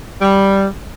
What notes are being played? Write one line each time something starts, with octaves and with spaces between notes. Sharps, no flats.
G3